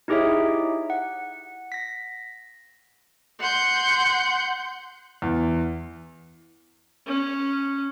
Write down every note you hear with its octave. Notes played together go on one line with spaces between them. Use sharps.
D#4 E4 G4 G#4 C#5 E5
F#5
A#6 B6
F#5 C6 G6
E2
C#4